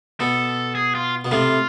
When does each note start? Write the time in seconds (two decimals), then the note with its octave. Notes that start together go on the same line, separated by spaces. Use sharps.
0.20 B2 A4
0.75 G#4
0.95 F4
1.25 B2
1.31 A2 C3 F4